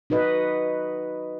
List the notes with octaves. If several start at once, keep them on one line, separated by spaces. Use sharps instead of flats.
D#4 F#4 B4 D#5